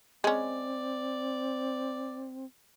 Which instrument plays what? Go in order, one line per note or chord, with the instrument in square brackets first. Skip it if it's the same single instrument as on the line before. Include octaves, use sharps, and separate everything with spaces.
[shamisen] G#3 C#4 [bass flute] C4 [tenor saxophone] D5